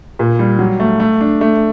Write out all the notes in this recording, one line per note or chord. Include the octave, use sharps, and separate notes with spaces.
A#2
G3
F#3
A3
A3
D4
A3